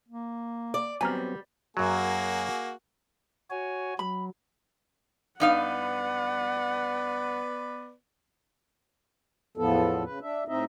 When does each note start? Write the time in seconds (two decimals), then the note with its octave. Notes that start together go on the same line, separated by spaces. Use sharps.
0.09 A#3
0.74 D5
1.01 F#3 G3 B3 C4 G#5 A#5 F6
1.77 F#2 F#3 A#3 F#4 G#4
3.50 F#4 C#5 G#5
3.99 F#3 B5
5.40 G2 B3 D#4 B4 D5 F5 F#5
9.57 E2 A2 F3 B3 A4
10.04 C#3 B4
10.22 D4 E5
10.48 A2 C4 D#4 D#5 E5